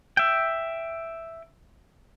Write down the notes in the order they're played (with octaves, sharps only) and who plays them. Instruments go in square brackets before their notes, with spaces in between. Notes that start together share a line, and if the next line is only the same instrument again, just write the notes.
[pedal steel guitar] E5 G5